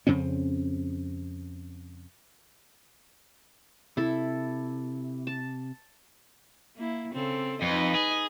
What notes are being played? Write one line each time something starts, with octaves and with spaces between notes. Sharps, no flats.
F2 C#3 C4 C#4
C3 E4 A4
A5
A#3 E4
C#3 C4 A4
F2 D#4 B4 D#5
G#4